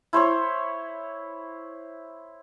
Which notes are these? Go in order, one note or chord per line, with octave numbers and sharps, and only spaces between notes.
E4 C5 C#5 C#6